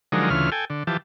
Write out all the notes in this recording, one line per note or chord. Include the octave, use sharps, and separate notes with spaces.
D3 F3 F#3 G#3 D#4 A#4
D2 C#3 E3 F4 F6
A4 G5 G#5
D3
E3 F3 G4 A5